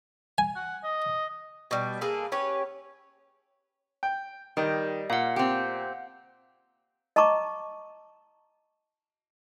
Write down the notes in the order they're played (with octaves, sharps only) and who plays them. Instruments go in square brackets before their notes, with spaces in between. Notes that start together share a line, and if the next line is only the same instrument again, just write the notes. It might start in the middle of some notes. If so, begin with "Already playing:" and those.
[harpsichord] G#5
[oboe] F#5
D#5
[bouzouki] B2 G3
A#3 G#4 A4 B4
C#4 G4 B4 C#5
[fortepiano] G5
[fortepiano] D#3 [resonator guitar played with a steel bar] G3 [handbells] D#5
[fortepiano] A#2 [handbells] F5 F#5
[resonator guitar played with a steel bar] C4 G4
[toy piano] D#5 A5 A#5 C#6 D6